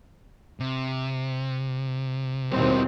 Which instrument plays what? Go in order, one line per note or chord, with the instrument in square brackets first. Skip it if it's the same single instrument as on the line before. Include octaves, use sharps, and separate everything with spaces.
[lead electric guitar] C3
[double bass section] D#2 B2 C4 [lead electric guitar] G3 E4